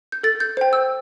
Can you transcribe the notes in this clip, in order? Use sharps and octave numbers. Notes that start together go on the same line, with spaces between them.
G6
A4 A6
G6
C5 G5
E6